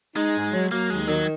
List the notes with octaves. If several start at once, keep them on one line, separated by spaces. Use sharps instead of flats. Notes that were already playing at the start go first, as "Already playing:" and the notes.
G#3 D#4
G#2
F#3
F#3 A#3
D#2 G#3
D#3 F#3